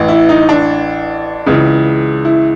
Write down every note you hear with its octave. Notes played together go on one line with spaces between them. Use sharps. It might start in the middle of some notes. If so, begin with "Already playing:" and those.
Already playing: A1 A2 E3
E4
D#4
D4
C#2 C#3 E3
E4